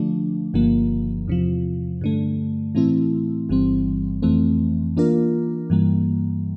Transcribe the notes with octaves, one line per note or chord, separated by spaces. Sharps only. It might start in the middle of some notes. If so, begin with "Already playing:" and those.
Already playing: D3 F3 A3 D4
G1 G2 D3 F3 A#3
E2 C3 F3
G2 D3 A3
A2 E3 A3 C4 E4
G1 G2 E3 G3 C4
F2 E3 A3 C4
E3 A#3 D4 F4 A#4
G2 E3 G3 A#3